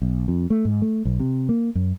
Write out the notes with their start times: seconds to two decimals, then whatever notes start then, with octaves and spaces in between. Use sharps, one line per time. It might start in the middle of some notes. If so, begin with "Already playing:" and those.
0.02 B1
0.28 F2
0.50 A3
0.65 G#2
0.82 A3
1.05 B1
1.20 C3
1.49 A#3
1.75 F#2